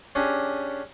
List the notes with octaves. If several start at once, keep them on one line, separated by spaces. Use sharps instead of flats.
C#4 D4 G4 G#4